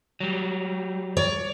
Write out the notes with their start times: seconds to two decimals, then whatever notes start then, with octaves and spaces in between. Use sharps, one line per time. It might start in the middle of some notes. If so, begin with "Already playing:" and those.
0.20 F#3 G3
1.17 C#5 D5